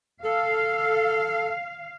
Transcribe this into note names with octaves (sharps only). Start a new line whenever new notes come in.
A4 F5